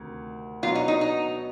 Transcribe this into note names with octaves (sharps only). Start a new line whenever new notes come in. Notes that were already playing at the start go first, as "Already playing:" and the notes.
Already playing: D2 C3 D#3
B2 F#3 B3 D4 F4 F#4
D#4
D#4
D#4